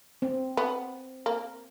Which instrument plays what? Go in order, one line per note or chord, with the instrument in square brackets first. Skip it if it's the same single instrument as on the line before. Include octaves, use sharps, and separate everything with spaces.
[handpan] C4
[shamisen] B3
A#3